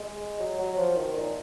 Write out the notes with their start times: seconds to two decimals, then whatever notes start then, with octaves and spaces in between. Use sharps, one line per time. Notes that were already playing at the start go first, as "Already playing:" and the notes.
Already playing: G#3
0.40 F#3
0.59 F#3
0.77 F3
0.97 D#3
1.15 A#2